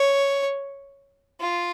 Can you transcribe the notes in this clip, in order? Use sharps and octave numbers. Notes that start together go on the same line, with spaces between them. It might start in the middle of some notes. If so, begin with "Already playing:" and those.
Already playing: C#5
F4